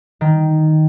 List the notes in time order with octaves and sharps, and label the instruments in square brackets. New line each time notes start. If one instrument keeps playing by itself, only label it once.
[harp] D#3